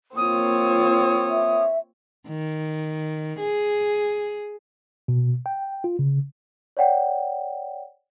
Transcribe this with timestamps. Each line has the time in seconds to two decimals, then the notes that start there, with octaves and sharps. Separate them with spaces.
0.17 A#3 C4 F4 C#5 D#6
1.30 E5
2.28 D#3
3.39 G#4
5.08 B2
5.46 G5
5.84 F4
5.99 C#3
6.77 C#5 D5 F#5 G5